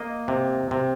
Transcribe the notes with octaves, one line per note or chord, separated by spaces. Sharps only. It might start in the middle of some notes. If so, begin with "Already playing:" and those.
Already playing: A#3 D#5
C3
C3